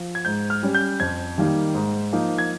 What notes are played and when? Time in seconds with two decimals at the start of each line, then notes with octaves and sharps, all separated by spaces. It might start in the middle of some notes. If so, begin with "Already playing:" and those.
Already playing: F3
0.15 G#6
0.25 G#2 G6
0.50 F6
0.63 G3 C#4
0.75 G6
1.00 F2 G#6
1.38 D#3 G3 A#3 D#4
1.75 G#2
2.13 F3 A#3 D#4
2.38 G#6